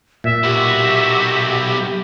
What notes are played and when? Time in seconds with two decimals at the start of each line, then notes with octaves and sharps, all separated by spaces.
0.24 A#2 E5
0.44 B1 F#4 G4